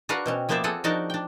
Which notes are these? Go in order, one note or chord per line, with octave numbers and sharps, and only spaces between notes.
D4 F#4 A#4 B4 F5 F#5
B2 C4 C#4
F3 A#3 B3 C5 D5 E5
C4 F4 G#4 A4 F#5
F3 D4 D#4 F#4 A#4 D5
D4 G5